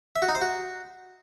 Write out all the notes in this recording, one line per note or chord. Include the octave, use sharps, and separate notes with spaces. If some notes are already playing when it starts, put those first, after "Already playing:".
E5
F#4
D#4
C5
F#4